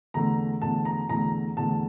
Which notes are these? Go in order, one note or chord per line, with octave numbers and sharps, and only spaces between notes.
E2 D3 A3 A#5
E2 D3 A3 A5
A#5
E2 D3 A3 A#5
E2 D3 A3 A5